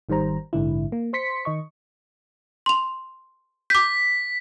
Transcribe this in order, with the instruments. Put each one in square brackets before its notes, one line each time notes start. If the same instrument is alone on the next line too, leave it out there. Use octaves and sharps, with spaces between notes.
[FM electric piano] G#1 D#3 G3 C5 A#5
A#1 G#2 D3 E4
A#3
C5 C6 B6 C#7
D#3 D#5 C#6
[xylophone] C6 F7
[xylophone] D6 G6 [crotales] B6